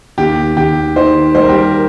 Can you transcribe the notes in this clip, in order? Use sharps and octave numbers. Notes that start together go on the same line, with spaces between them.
D#2 G4
D#2 G4
D#3 C5
G3 C5
A#4
G4
A#4